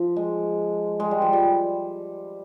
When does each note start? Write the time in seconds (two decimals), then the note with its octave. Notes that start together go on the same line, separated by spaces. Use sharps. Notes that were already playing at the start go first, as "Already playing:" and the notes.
Already playing: F3
0.16 G#3
1.00 G#3
1.11 G3
1.22 F3
1.33 G3